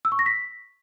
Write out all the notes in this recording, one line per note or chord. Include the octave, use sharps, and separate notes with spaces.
E6
C#6
A#6
B6